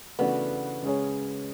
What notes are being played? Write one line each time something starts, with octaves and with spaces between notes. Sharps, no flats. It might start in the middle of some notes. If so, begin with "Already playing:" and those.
C#3 E3 A3 B3 D4 F#4
C#3 G#3 C#4 G#4 C#5